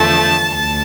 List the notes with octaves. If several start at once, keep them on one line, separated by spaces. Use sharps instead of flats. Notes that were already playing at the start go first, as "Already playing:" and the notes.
Already playing: E2 D3 F3 A3 A5
D2 A5